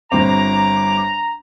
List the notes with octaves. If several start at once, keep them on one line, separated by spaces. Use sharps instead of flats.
G1 C4 A#5 D6